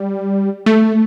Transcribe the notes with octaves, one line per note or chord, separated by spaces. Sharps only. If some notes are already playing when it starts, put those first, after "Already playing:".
Already playing: G3
A3